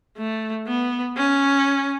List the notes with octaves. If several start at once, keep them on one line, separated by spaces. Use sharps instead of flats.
A3
B3
C#4